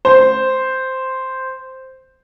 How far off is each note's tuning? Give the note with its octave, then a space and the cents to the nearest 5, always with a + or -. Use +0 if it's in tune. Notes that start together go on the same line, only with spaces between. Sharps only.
C5 -5